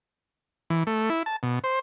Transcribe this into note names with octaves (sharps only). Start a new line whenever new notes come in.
E3
A3
E4
A5
B2
C5